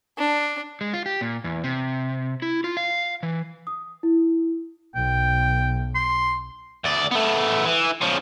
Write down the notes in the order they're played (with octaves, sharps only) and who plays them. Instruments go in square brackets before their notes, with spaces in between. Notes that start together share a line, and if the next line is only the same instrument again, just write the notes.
[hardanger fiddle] D4
[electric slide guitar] G#3
F4
G4
A#2
E2
C3
E4
F4
F5
E3
[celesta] D#6
E4
[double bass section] B1 [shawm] G5
[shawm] C6
[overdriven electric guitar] D2 D5
A3 B3
E3
C#3 F3